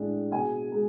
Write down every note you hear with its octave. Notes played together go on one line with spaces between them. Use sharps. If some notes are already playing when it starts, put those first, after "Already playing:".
Already playing: A2 G#3 D4 G#4
B2 G#4 G#5
G#3